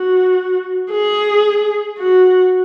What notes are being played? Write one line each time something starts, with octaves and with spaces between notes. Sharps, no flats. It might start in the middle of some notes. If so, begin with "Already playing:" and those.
Already playing: F#4
G#4
F#4